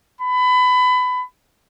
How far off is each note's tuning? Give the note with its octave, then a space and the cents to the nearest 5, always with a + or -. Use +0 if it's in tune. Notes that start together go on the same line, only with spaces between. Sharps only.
B5 +25